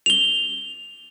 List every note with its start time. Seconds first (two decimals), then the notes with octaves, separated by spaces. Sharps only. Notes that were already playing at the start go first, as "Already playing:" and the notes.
0.06 F7 G7